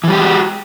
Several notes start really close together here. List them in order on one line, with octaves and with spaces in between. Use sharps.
E3 G3 G4 G#3 F#4